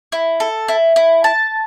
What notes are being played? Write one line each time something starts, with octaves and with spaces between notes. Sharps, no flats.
E4
A4
E4
E4
A5